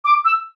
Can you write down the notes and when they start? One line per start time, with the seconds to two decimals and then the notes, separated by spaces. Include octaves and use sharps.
0.05 D6
0.25 E6